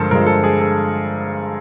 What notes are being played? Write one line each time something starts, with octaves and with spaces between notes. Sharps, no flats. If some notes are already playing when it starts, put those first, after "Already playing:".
Already playing: G2 D3 F3 G#3 A4 A#4 C5
G2 D3 F3 G#3 A#4
A4
G#4
A4